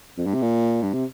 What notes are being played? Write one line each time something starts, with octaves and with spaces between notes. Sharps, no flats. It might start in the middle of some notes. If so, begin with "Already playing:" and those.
F2
G2
C3
A#2
G2
C3